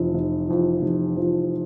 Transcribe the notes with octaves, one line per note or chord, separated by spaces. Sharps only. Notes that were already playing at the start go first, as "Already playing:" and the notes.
Already playing: F1 F2 E3
F1
F2 E3
F1
F2 E3